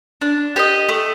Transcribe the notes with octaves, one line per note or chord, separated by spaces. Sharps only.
D4
G4 C5 D#5
A3